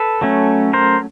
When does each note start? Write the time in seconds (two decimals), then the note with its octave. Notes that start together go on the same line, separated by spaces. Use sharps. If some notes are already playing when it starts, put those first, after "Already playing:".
Already playing: A4 B4
0.22 F#3 A3 C#4
0.73 A#4 C5